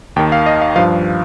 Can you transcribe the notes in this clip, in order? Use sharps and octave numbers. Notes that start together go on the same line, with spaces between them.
D#2 D#3 G5
F5
D#5
F5
G2 F3 F5